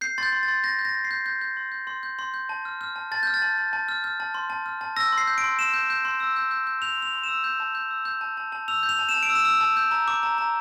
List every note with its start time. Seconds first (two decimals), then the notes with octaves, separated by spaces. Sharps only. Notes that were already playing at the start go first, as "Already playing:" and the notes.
0.01 G6 C7
0.18 C6 G6 A6
0.32 C6
0.43 A6
0.48 C6
0.64 G6 A#6
0.79 G6
0.85 A#6
0.95 G6
1.05 C7
1.11 G6
1.26 G6
1.41 G6
1.57 C6
1.72 G6
1.87 C6
2.03 G6
2.19 C6
2.34 G6
2.49 A5
2.65 F6
2.81 F6
2.96 A5
3.11 A5 A6
3.23 F6 G6
3.34 A6
3.42 A5
3.58 A5
3.73 A5
3.88 F6
4.04 F6
4.20 A5
4.34 C6
4.50 A5
4.66 F6
4.81 A5
4.96 E6 A#6
5.12 C6
5.18 C7
5.27 G6
5.38 D7
5.44 C6
5.59 C6 E7
5.74 G6
5.90 G6
6.05 C6
6.20 E6
6.36 G6
6.51 G6
6.67 G6
6.82 G6 F7
6.98 C6 F7
7.13 C6
7.23 E6 E7
7.44 G6
7.60 A5
7.75 G6
7.91 E6
8.05 G6
8.21 A5
8.37 A5
8.52 A5
8.68 E6 F7
8.83 G6
8.89 F7
8.99 A5
9.09 E7
9.14 A5
9.23 D7
9.30 E6
9.35 E7
9.45 E6
9.61 A5
9.77 G6
9.91 A#5
10.08 D6
10.23 A#5
10.38 A#5